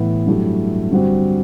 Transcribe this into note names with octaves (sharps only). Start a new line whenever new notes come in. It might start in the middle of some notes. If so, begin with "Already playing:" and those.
Already playing: A2 E3 B3 E4
G2 F#3 A3 E4 G4
G2 D3 G3 C4 F#4